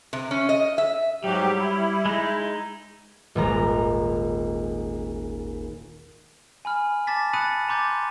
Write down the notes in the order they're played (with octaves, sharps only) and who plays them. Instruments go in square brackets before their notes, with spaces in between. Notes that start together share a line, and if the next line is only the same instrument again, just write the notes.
[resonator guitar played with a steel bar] C3
C#4
D#5
E5
[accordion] G#2 F#3 G4 [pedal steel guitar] G3
[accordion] E4
[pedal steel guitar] G#3 D#4
[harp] D#1 G#1 A#5
[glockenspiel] G#5 B5 F6
A5 D6 A6 B6
B5 D#6 F#6 A6 C#7 D#7
A#5 C6 D6 G6 A6